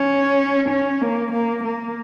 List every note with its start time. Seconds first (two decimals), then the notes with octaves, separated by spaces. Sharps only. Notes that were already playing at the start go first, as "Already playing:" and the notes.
Already playing: C#4
0.69 C#4
1.01 A#3
1.33 A#3
1.64 A#3